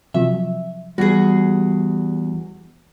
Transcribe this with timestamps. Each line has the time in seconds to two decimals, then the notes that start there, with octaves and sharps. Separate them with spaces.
0.14 C3 F3 F#3 E5
0.98 E2 G3 F#4 G#4